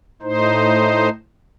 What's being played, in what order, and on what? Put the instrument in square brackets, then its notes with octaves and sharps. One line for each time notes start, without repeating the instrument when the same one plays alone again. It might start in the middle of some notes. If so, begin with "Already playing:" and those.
[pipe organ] A2 D#4 C5